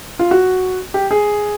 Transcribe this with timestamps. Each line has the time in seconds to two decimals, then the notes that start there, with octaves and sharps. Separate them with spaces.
0.19 F4
0.31 F#4
0.94 G4
1.11 G#4